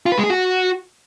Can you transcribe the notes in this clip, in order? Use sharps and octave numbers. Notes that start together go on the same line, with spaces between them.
F4
B4
G#3
G#4
F#4